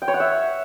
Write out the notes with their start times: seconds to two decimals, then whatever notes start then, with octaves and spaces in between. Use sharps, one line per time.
0.02 G5
0.08 C#5
0.14 F#5
0.20 E5